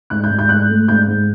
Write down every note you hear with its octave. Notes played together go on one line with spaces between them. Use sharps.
G#2 F#6
G6
G#2
G6
G#2 F#6
A3
G#2 G6
G#2